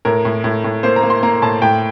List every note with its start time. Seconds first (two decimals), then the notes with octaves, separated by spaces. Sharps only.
0.05 A2 A#4
0.25 A2
0.44 A2
0.64 A2
0.83 A#3 C5
0.96 A#5
1.03 A#3
1.10 C6
1.23 A#3 A#5
1.42 A2 A5
1.62 A2 G5